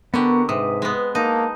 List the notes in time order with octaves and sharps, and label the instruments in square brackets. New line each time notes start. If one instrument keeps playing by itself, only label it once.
[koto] D3 G4 [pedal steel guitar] B3 [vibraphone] A#4 A#5 C#6
[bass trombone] G#2 [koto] C3 [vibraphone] B4 [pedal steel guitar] D#6
[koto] G#3 B3
[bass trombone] A#3 [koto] D#4 [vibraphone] A5